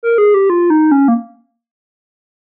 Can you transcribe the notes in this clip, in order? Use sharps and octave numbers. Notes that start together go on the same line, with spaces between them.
A#4
G#4
G4
F4
D#4
C#4
A#3